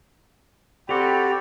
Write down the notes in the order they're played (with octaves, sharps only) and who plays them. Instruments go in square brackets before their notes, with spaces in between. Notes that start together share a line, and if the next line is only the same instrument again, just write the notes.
[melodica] C4 F#4 D5 [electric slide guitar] G4 A4 [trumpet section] G5 B5